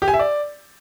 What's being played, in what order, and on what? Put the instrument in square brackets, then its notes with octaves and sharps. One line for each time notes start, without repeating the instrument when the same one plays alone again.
[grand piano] G4
G#5
E5
D5